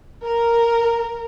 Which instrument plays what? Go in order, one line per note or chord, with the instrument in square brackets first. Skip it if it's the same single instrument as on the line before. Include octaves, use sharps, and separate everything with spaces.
[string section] A#4